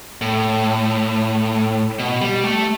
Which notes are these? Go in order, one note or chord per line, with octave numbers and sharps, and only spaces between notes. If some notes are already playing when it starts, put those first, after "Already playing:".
A2
B2
G3
A3